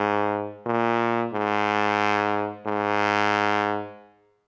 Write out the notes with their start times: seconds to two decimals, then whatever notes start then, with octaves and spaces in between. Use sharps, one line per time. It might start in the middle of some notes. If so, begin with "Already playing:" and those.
Already playing: G#2
0.66 A#2
1.33 G#2
2.66 G#2